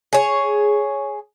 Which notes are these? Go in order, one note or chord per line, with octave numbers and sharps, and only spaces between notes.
G#4 C#5